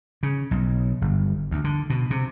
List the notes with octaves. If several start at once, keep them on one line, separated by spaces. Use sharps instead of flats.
C#3
B1
G1
D2
D3
B2
C3